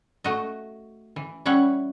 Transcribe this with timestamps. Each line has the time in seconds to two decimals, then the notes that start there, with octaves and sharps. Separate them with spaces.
0.24 A3 F#4 D#5
1.16 E3
1.46 G3 C#4 E4 F#5